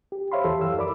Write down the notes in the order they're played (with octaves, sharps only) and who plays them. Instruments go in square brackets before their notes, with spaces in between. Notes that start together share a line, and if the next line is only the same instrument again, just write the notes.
[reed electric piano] G4
C5 C#5 E5 F5 B5 C6
D#2 E3 G4 A4 E5 C6
F#2 F5 E6
E4 A#4 D5 B5 D6